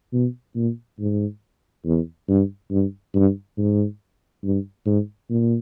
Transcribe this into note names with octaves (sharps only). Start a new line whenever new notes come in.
B2
A#2
G#2
E2
G2
G2
G2
G#2
G2
G#2
A#2